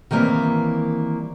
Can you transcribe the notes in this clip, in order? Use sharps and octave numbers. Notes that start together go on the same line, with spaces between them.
D#3 E3 G3 A#3 C4